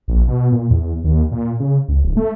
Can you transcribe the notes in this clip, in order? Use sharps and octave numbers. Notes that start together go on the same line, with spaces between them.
A#1
B2
A#2
E2
D#2
A#2
C#3
C#2
D1
A3